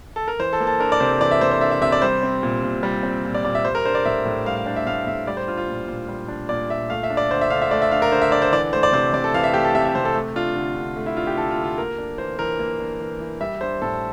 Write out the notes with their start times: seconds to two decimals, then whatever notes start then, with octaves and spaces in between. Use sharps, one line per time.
0.16 A4
0.28 A#4
0.39 E3 C5
0.53 A4
0.60 A#3
0.67 A4
0.80 D4 A#4
0.92 D5
1.00 C3 C5
1.20 E3 D5
1.31 E5
1.41 A#3 C5
1.51 C5
1.61 D4 E5
1.71 E5
1.81 C3 E5
1.92 D5
2.02 G3 C5
2.23 C4
2.43 A#2
2.63 A#2
2.83 G3
3.03 C4
3.25 A#2
3.35 D5
3.45 A#2 D5
3.55 E5
3.65 G3 C5
3.75 A#4
3.85 D4 C5
3.95 D5
4.05 A2 E5
4.25 A2
4.46 G3 F5
4.56 F5
4.66 D4 C5
4.76 E5
4.86 A2 F5
5.07 A2 E5
5.27 G3 D5
5.37 C5
5.47 D4 F4
5.57 F4
5.68 A#2
5.88 A#2
6.08 G3
6.28 D4
6.49 A#2 D5
6.70 A#2 E5
6.90 A3 F5
7.03 E5
7.10 D4
7.17 D5
7.30 D3 C5
7.41 E5
7.50 D3 F5
7.62 E5
7.71 A3 D5
7.82 E5
7.91 D4 F5
8.02 A#4
8.12 D3 C5
8.22 E5
8.32 D3 D5
8.42 C5
8.52 E3 D5
8.73 A3 C5
8.83 D5
8.93 C3 C5
9.14 C3 D5
9.24 A4
9.34 E3 F5
9.44 E5
9.54 A3 G4
9.65 A4
9.75 C3 E5
9.85 E5
9.95 C3 C5
10.05 A4
10.15 A3
10.36 D4 F4
10.56 D3
10.76 D3
10.96 A3
11.06 E4
11.17 D4 F4
11.27 G4
11.37 D3 A4
11.51 F4
11.58 D3
11.64 F4
11.78 A#3 A#4
11.98 D4
12.18 E3 C5
12.39 E3 A#4
12.59 A#3
12.80 D4
13.00 E3
13.20 E3
13.41 G3 E5
13.61 D4 C5
13.82 A2 A4